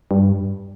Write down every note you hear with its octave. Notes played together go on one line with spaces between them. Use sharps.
G2